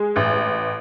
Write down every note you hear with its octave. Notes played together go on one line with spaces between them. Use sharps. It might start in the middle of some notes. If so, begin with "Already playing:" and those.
Already playing: G#3
A1